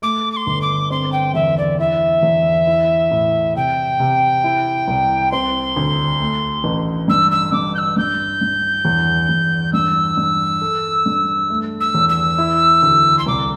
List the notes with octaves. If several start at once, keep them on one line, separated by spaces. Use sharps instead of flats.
A3 D6
D6
C6
G1
D6
C4 C6
G5
E2 E5
D5
E4 E5
E2
E4
A2
C3 G5
C3
E4
C2
C4 C6
D2
A3
A1
G2 E6
E6
G2 D6
G6
E6
G2 G6
G2
E2
E2
G2 E6
G2
A4
G2
A3
E6
E2
E6
E4
D2
C6
C2 D6